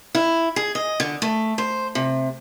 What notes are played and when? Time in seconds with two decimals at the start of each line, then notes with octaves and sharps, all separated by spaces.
0.15 E4
0.56 G#4
0.75 D#5
1.00 D3
1.22 A3
1.58 C5
1.95 C3